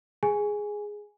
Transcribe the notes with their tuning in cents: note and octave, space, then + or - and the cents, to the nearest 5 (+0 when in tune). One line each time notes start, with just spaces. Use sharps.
G#4 +0 G#5 +0